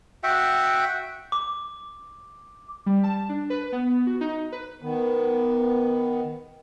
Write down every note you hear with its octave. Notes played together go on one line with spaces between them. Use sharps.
F#4 E5 F#5 G5
D6
G3
A5
D4
B4
B3
F#4
D#4
B4
D#3 B3